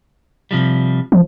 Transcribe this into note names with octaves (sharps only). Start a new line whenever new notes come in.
C3 F3 G3
F3